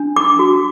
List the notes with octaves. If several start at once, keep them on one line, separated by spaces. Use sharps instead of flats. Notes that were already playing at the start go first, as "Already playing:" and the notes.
Already playing: D4
D6
F#4